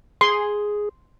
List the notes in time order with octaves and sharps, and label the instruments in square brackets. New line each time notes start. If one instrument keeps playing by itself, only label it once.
[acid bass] G#4 [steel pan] C6